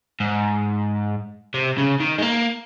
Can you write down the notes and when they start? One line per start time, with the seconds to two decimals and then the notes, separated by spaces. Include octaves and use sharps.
0.20 G#2
1.54 C3
1.77 C#3
2.00 D#3
2.18 G#3
2.22 A#3